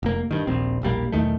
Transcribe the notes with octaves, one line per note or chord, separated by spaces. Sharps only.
F1 A#3
G2 D#3
D#1 A#1 C4
E1 A#1 G3 A#3
B1 E2 D#3 A3